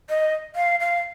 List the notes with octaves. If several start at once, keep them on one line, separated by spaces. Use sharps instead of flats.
D#5
F5
F5